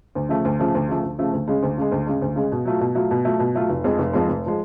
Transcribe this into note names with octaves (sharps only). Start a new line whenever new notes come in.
D2
C#3 F3 A3
D2
C#3 F3 A3
D2
C#3 F3 A3
D2
C#3 F3 A3
D2
C#3 G#3
D2
C#3 G#3
D2
C#3 G#3
D2
C#3 G#3
B2
F#3 A3 F4
B2
F#3 A3 F4
B2
F#3 A3 F4
B2
F#3 A3 F4
F1
F2 F3 G#3
F1
F2 F3 G#3
F1
F3 G#3